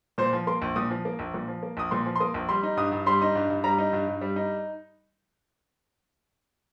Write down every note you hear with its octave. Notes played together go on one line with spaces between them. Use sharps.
A#2 C5
F3
A#3 C6
A#1
A#2 D#6
F3
A#3
A#1
A#2
F3
A#3
A#1 D#6
A#2 C6
F3
C6
A#3 D#6
A#1
G3 C6
D#4
G2 D#6
G2
G3 C6
D#4
G2
G2
G3 A#5
D#4
G2
G2
G3
D#4